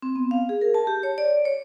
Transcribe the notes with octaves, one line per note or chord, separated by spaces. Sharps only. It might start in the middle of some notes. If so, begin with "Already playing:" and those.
C4
B3
F5
G#4
A#4
A5
G4
C#5
D5
C#5